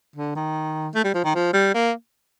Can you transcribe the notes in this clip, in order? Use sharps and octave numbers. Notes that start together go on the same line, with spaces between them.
D3
D#3
A3
G3
F3
D#3
F3
G3
A#3